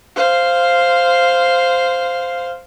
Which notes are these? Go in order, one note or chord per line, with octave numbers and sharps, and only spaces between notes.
C5 F5